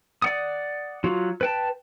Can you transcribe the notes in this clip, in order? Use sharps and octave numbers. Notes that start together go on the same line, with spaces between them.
D5 F#5 D#6
F#3 F4 F#4
B4 G5 A5